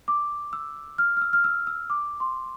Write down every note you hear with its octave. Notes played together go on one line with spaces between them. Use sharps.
D6
E6
F6
F6
E6
F6
E6
E6
D6
C6